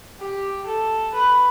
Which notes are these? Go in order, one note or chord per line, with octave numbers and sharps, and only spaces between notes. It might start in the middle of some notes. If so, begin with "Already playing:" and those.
G4
A4
B4